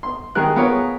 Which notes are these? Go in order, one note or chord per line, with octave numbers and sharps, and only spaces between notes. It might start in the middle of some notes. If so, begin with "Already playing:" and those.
C6
D#3 G#3 G#4 A#4 F#6
B3 F4 G#4 A#4 C#5